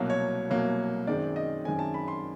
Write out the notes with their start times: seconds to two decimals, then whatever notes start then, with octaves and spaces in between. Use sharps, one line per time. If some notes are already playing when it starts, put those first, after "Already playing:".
Already playing: C2 B2 F#3 A#3
0.10 C#5
0.50 C2 B2 F#3 A#3
1.07 F#2 D#3 G#3 C4 D5
1.36 D#5
1.65 F#2 D#3 G#3 C4 G#5
1.79 A5
1.94 B5
2.08 C6